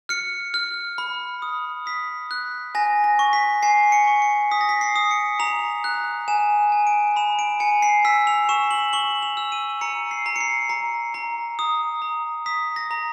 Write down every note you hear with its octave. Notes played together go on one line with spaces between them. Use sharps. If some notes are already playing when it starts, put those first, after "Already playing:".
F6 C#7
F6
B5
D#6
D#6 B6
F#6
G#5 A#6
A#6
C#6
B6
G#5 C7
C#7
C#6
C#7
D#6 B6
A#6
B6
C7
D#6
C#7
A#5 F7
F#6
G#5 E7
G#5
D7
B5 E7
D7
G#5 C#7
C7
E6 B6
F7
C#6 E7
F#7
C#6 F#7
F7
E6
D#7
A#5 C#7
C7
A#5
C#7
C7
A#5
A#5
D#6
A#5
D#6 B6
A#6
A#5